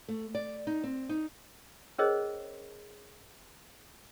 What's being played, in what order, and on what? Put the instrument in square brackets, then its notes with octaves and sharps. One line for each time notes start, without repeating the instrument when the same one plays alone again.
[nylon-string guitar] A3
D5
D#4
C4
D#4
[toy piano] C#4 G#4 A#4 C5 C#5 D#5